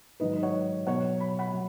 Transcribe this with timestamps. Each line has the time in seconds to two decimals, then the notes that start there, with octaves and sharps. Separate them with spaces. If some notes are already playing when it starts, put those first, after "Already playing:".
0.20 G#2 D#3 F#3 B4 D#5
0.43 C#5 F#5
0.86 B2 F#3 C#5 F#5
1.20 B5
1.39 F#5 B5
1.53 F#3